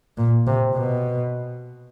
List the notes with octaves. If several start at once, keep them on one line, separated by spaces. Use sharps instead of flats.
A#2
C3
B2